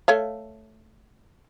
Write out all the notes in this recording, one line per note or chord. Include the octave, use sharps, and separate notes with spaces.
A3 C#5 F5